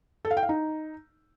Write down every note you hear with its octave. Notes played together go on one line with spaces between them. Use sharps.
A4
F5
G5
F5
D#4